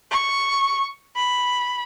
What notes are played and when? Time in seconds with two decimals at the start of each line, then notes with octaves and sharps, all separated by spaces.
0.11 C#6
1.16 B5